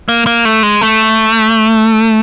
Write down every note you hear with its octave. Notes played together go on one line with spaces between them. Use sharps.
A#3
A#3
A3
G#3
A3